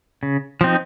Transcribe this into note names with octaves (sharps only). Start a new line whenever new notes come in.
C#3
F3 C4 D#4